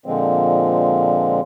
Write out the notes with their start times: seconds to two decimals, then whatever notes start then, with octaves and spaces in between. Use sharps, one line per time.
0.06 A#2 D3 F3 G#3 C4